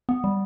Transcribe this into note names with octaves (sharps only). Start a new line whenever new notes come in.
B3
G3